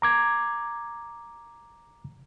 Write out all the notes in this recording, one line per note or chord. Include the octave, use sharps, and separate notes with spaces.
A#5 D6 G#6